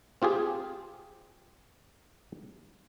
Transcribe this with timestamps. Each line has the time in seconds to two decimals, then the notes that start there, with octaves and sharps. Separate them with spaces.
0.22 C4 F4 G4 G#4